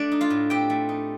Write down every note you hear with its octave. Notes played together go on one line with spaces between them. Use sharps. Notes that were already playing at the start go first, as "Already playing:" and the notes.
Already playing: A3 D4 D5
D#4
F4 F5
A2
C4 G4 G5
A3
D#4